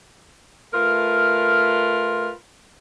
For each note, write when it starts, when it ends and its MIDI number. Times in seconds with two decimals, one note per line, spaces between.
0.74 2.30 57
0.74 2.30 65
0.74 2.30 70
0.74 2.30 71